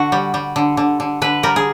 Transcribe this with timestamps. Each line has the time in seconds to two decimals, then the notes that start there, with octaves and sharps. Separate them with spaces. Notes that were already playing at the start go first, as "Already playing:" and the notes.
Already playing: D3 F#4
0.12 G3
0.34 G3
0.56 D3
0.77 D3
1.00 D3
1.22 D3 B4
1.43 G3 A#4
1.56 G#4